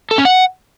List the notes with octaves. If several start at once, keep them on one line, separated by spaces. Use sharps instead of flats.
A4
C#4
F#5